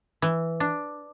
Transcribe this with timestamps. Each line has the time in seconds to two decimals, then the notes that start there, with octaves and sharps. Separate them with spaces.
0.22 E3
0.60 D4